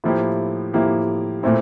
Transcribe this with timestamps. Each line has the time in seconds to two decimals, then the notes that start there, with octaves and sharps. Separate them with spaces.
0.04 A2 F3 A#3 E4 G4
0.73 A2 F3 A#3 E4 G4
1.43 A#2 A3 C4 E4